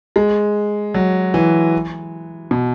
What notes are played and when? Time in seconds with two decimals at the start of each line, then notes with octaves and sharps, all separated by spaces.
0.16 G#3
0.94 F#3
1.34 E3
2.51 B2